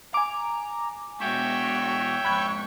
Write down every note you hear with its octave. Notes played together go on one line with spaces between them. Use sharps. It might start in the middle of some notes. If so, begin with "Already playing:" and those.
G#5 A#5 D6
B2 G#3 F#4 C#5 E5 G5
F2 G#2 B5 C#6 F#6 G#6